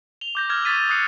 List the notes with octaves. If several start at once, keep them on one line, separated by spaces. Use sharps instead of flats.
F7 G7
D6 G6 A#6
D6 E6 F6 G#6
C#6 D#6 G#6 A6 B6 D#7
D#6 F#6 C7 C#7